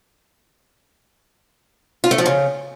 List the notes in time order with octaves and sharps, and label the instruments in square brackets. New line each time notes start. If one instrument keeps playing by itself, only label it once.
[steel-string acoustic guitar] F4
A3
F3
C#3